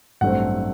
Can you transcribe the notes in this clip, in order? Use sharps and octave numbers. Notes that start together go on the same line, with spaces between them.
A1 G2 F#3 A3 C4 F#5